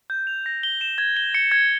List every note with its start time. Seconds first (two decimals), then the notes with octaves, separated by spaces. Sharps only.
0.10 G6
0.27 F7
0.46 A#6
0.63 G7
0.81 E7
0.98 G#6
1.17 G7
1.35 C#7
1.52 G#6